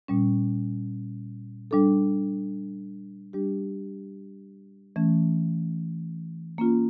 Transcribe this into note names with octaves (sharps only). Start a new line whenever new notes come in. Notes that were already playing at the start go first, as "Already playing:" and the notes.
A#2 G3 C#4
G3 D4 A4
G3 D4 G4
E3 A3 C#4
A#3 C#4 F4